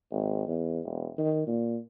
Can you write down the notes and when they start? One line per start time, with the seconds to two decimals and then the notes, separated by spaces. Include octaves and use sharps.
0.11 G#1
0.47 E2
0.85 E1
1.18 D#3
1.47 A#2